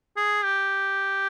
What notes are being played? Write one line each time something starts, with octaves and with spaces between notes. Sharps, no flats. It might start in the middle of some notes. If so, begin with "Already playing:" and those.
G#4
G4